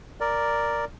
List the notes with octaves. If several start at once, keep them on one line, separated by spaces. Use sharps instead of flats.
A#4 D5